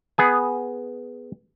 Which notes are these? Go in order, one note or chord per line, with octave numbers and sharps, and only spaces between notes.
B3 G#4 G#5